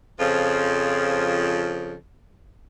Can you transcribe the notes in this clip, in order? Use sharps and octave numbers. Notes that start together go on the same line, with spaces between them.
F2 C#3 F3